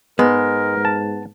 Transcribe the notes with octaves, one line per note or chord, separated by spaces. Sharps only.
G#2 G#3 B3 A#4
A5